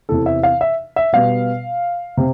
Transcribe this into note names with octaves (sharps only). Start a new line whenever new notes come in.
E2 C3 E3 A4
E5
F5
E5
E5
B2 G3 B3 F5
C3